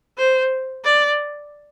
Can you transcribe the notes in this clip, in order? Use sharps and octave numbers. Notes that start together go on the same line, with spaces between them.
C5
D5